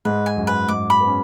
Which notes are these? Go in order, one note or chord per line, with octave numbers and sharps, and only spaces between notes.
G#2 G#3 B4
G#5
F#2 F#3
B4
G#2 G#3 D6
B5
B3
C#4